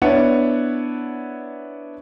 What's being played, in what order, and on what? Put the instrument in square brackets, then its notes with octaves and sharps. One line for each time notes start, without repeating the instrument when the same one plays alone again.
[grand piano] B3 D4 E4 C#5 F#5